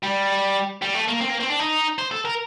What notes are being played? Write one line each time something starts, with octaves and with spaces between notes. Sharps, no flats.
G3
G3
A3
A#3
C4
A#3
C4
D4
D#4
C5
A4
A#4